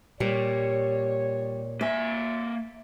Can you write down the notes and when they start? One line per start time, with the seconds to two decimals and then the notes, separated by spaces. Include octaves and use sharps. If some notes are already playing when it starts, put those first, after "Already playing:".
0.20 A#2 G3 C#5
1.81 A#3 E5 G#5